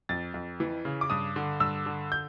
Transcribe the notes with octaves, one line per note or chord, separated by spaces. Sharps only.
F2 A6
F2
E3
C#3
D6
G2 D#6
D3
G2 E6
D3
G6